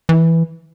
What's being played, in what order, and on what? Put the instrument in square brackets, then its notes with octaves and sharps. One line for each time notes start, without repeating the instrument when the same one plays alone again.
[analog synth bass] E3